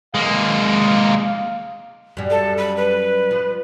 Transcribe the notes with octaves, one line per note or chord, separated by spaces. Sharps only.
G#3 A#3 F5
F#2 G3
A4
B5
B4
F3